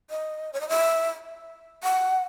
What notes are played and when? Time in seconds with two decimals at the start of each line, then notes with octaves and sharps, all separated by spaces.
0.10 D#5
0.53 C#5
0.61 D#5
0.69 E5
1.83 F#5